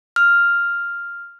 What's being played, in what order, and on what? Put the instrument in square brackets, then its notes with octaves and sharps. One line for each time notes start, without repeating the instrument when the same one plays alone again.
[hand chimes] F6